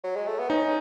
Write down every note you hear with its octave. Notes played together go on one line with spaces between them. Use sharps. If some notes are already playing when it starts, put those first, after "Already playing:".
F#3
G#3
A3
B3
C#4 D#4